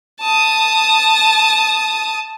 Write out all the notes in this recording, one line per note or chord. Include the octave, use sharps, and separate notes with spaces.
A5 D#6